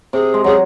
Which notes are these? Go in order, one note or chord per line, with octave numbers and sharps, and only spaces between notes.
C3 G#4
G#3
F#3 G#4